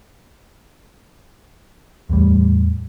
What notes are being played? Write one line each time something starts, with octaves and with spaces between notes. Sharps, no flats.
E2 A2 G3